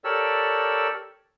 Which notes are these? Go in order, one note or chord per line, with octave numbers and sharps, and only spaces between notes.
G4 A4 A#4 C#5 D5 E6